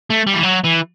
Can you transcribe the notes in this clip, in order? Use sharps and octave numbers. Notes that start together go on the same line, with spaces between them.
A3
G3
E3
F#3
E3